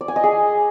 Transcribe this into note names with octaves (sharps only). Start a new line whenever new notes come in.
D5
G#5
D#5
G#4